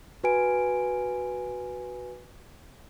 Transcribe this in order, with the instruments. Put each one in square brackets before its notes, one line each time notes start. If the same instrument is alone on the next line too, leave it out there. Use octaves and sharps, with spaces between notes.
[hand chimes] F#4 B4 G#5 D7